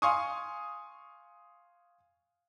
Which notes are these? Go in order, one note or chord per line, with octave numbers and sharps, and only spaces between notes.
F5 G#5 C6 C#6 D#6